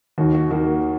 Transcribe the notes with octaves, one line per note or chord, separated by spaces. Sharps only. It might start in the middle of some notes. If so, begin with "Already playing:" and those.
D#2 D#3 A#3 F#4
F#4
D#2 D#3 A#3 F#4